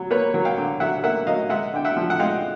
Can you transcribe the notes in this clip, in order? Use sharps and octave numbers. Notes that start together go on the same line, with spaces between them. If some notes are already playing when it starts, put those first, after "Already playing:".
Already playing: F#3
A#3 B4 C#5
F#3
F5 G5
D3
F#3 E5 F#5
A#3 E5 F#5
F#3 D#5 F5
G#3 E5 F#5
D3 G5
E5 F#5
F3
F#5
G#3 F5 G5